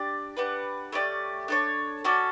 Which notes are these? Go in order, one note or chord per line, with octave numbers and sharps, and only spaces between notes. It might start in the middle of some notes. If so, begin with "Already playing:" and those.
Already playing: D4 G4 D5
D4 G4 B4 F#5
A3 C#4 G4 D5
D4 A4 C#5
C#4 F#4 A4 D5